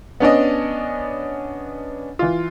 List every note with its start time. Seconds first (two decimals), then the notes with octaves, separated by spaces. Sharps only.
0.20 B3 C#4 D4 D#5
2.19 E3 F4